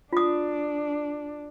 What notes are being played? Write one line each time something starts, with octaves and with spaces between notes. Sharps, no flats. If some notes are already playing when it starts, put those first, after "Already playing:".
D4 F4 D#6